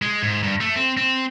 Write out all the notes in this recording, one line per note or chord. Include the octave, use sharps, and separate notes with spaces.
G#3
G#2
G2
A3
C4
C4